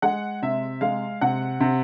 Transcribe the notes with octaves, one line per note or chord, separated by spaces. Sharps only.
G#3 F#5
C3 E5
G#3 F5
C3 F#5
C3